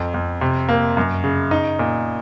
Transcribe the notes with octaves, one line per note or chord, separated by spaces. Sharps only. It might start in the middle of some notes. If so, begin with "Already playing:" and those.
Already playing: F2
F2
C3
A#3
F#2
C#3
D#4
A#2